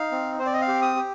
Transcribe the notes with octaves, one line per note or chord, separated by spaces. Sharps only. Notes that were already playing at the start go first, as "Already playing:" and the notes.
Already playing: D#4 F5
C4
C4 C5
D5
D#5
F5
G4
D#6
G4